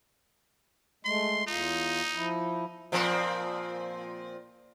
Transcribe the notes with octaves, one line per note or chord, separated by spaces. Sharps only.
G#3 A3 C6
E2 D#4 F4
F3 E4
A#2 F3 C4